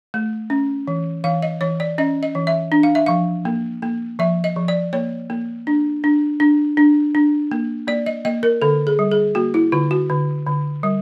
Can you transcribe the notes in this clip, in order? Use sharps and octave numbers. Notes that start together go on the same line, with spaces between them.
A3
C#4
E3
E3 F5
D#5
E3 C#5
D5
C#4 D#5
D#5
E3
E5
D4
F5
E5
F3 F5
A#3
A#3
F3 E5
D#5
F3
D5
A#3 C#5
A#3
D4
D4
D4
D4
D4
A#3
A#3 D5
D#5
A#3 D#5
A#4
D3 A4
G#4
G3
G#4
A#3 F#4
E4
D3 F4
F#4
D3
D3
G3